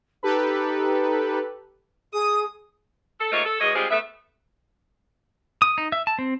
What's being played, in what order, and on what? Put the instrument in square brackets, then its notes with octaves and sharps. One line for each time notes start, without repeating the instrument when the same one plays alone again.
[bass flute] D#4 [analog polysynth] G4 A4 B4
[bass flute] G#4 [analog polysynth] D#6
[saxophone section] A4
G#2 A3 A#3 F4 C#5 D#5
A4
E2 G#3 F#4 C#5 D#5
G3 G#3 C4 F4 G4 G#4
A3 B3 E5
[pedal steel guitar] D#6
D#4
E5
A5
C4